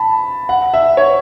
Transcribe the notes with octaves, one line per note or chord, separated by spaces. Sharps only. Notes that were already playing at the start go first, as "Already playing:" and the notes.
Already playing: A5 B5
F#5
E5
C#5